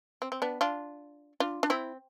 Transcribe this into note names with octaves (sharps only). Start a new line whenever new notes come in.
C4
C4
B3 D4
D4 F4
D4 F4
D4
C4 E4